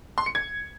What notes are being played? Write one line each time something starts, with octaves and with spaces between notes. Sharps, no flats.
C6
C#7
G#6